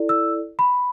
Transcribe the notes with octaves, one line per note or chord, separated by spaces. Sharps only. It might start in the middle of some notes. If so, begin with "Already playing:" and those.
Already playing: E4 A4 D5
E6
B5